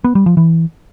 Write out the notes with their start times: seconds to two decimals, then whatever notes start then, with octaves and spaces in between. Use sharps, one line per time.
0.04 B3
0.15 G3
0.26 F3
0.37 E3